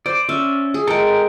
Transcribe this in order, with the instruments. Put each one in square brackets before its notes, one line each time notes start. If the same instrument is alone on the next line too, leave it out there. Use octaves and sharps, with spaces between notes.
[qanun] C5 [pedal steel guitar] D5
[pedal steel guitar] C#4 [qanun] D5 E5
[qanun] G#4
[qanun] G#3 C#6 [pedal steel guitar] A4 A#4 G5